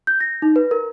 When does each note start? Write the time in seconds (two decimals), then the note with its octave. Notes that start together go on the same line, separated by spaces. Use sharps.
0.07 G6
0.20 A#6
0.42 D#4
0.56 B4
0.71 A#4